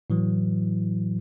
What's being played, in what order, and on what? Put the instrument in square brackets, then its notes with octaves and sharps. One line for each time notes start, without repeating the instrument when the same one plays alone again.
[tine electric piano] A2 E3 F#3